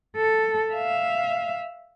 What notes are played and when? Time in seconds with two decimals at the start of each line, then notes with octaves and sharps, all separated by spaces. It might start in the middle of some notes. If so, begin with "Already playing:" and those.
0.16 A4
0.74 E5 F5